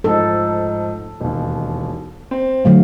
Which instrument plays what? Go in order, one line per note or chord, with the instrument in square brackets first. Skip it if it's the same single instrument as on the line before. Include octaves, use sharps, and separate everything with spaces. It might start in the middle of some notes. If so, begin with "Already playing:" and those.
[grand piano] G#2 F3 D#4 [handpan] A4
[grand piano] E1 D#2
C4
[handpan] D3 F#3 A3 [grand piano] F5